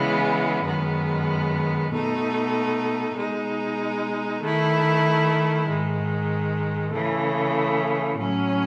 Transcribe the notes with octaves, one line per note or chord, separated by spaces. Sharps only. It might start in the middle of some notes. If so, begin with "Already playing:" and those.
Already playing: C#3 E3 G#3 B3
F#2 D#3 G#3 B3
B2 A3 D#4
B2 G#3 D#4
D#3 A3 E4
G#2 D#3 G#3
C#3 E3 A3
A2 F#3 C#4